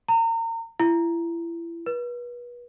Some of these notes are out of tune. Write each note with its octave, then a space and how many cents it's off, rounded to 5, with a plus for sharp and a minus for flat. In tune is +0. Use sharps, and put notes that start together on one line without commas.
A#5 -35
E4 +30
B4 -35